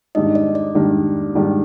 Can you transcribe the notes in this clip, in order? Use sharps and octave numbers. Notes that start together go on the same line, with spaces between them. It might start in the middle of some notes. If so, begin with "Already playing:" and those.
G#2 D#3 G3 D4 D#4 D#5
D5
D5
G#2 D#3 G3 D4
G#2 D#3 G3 D4